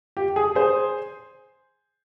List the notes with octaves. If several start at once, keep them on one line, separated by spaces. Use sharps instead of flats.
G4
G#4
G#4 C5